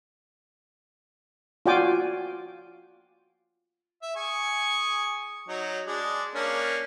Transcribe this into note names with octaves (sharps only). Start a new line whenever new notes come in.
F4 F#4 D5 G5 G#5 D6
E5
G#4 G#5 C#6
F#3 D#4
G#3 D4
A#3 C#4 D4